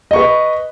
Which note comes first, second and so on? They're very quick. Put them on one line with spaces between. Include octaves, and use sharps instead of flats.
D#5 C#6 B4